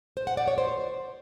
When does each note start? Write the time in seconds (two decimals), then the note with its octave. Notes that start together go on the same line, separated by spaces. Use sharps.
0.17 C5
0.27 F#5
0.37 D5
0.48 C#5
0.58 C5